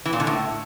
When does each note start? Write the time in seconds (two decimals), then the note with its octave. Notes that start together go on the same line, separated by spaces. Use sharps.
0.06 E3
0.13 A#2
0.20 D3
0.27 A2